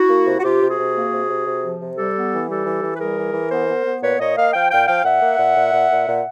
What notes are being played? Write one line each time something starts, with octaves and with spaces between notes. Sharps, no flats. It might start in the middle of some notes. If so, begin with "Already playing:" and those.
Already playing: E4 F#4
A#3
C3
F#4
C3 F4 G4
C3
F#4 G#4
C3
A#3
C3
C3
C3
F3
C3
G3 G4 A4
B3
E3
G3 G4 A4
E3
E3
B4
G3 G#4 A#4
E3
E3
B3 A#4 C5
B3
B3
A#2 B4 C#5
A#2 C#5 D#5
A#3 D#5 F5
F3 F5 G5
A#2 F5 G5
F3 F5 G5
A#2 E5 F#5
A#3
A#2
A#2
A#2
A#2
A#2